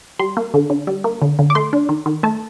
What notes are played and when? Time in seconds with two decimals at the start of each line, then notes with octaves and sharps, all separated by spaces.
0.19 G3 C6
0.37 A#3
0.54 D3
0.70 D3
0.87 G3
1.04 A#3
1.22 D3
1.39 D3
1.50 D6
1.55 A3 C6
1.73 D4
1.89 D#3
2.06 D#3
2.23 A3 A5